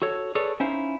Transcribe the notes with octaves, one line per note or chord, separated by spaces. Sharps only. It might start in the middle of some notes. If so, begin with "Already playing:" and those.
F#4 A4 C#5
G#4 A4 B4 C#5 D5
C#4 D#4 E4 C5 F5